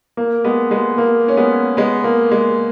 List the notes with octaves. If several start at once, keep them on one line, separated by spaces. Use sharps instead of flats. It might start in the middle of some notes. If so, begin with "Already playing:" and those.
A#3
G#3 B3
G#3 B3
A#3
C#4
G#3 B3
G#3 B3
A#3
G#3